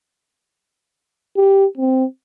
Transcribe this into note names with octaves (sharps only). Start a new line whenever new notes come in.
G4
C4